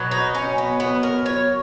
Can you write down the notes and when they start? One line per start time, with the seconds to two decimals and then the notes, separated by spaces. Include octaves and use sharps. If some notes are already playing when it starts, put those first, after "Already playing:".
Already playing: B2 F#3
0.11 D#4
0.35 C#4
0.58 B3
0.80 B3
1.03 A#4
1.26 C#5